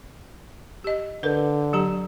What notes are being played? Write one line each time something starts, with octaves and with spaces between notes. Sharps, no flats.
G4 D#5
D3 A#4 B4
F#3 G4 A#5